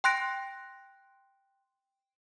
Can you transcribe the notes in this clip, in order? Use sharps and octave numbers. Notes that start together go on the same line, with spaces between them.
G5 C6 F#6 A#6 D7